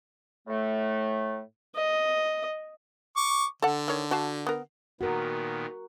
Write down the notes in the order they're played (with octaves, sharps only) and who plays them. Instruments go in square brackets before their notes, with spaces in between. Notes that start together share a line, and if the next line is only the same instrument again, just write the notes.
[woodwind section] A2 A3
[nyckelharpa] D#5
[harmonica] C#6 D6
[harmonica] D3 [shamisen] A4 F#5
[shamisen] D#3 C#5
F#4 F5 A5
B3 A#4
[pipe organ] A#2 D#3 B3 [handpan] F#4 A#4